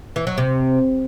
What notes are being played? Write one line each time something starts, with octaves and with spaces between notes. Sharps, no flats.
E3
F#3
C3